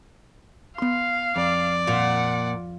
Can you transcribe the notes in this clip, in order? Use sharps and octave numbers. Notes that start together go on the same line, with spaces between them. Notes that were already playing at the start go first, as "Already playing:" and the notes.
B3 F5 C6
F2 D5
A#2 F#5